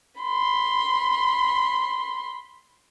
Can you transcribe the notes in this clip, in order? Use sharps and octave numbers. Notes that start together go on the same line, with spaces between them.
B5 C6